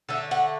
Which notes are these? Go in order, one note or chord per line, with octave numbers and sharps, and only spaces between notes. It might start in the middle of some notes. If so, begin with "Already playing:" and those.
D3 A3 E5
F#5